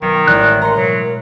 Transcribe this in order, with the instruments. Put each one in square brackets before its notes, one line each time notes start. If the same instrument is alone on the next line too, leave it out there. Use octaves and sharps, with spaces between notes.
[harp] B1 [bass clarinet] D#3
[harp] A1 G#3 [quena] D5 [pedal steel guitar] F#6
[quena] A#4 [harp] A#5 C6 C#7
[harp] B2 [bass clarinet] F#3